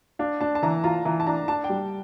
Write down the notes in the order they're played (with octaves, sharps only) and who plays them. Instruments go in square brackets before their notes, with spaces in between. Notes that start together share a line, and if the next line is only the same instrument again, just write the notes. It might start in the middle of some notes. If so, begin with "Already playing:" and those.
[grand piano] D4 [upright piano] F5
[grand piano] D4 [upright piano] A5
[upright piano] A5
[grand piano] E3 [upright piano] A#5
[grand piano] F4 [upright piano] A#5
[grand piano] E3 [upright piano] A#5
[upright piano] A5
[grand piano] D4 [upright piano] A#5
[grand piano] D4 [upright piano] A5
[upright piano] G5
[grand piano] G3